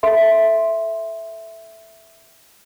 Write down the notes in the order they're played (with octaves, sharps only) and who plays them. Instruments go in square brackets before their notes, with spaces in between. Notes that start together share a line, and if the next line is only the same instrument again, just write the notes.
[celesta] A4 E5 C6